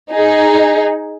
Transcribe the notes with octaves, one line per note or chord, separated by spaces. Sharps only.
D#4 G#4